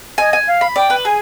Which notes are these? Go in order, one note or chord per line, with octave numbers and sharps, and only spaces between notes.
D#5 G#5
G#5
F5
B5
D5 G5
B4
G#4 G#5